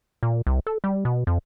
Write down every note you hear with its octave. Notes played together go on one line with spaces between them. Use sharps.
A#2
C2
A4
G3
B2
F2